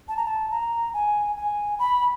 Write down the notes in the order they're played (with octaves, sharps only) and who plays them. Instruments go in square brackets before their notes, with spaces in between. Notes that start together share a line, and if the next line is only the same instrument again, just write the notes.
[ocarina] A5
A#5
A5
A#5
G#5
G#5
B5